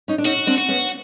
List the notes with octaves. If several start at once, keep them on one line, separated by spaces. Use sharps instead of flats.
C#4 D#4
D4
C#4 D#4 F#4
C4 D4
F#4
B3 C#4